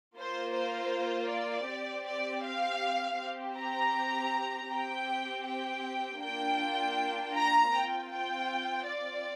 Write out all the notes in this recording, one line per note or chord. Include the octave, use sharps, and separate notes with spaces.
A#3 F4 C5
C5
D5
C4 G4
D5
F5
C4 G4
A#5
C4 G4 G5
G5
A#3 D4 F4 G5
A#5
C4 F4 G5
G5
D5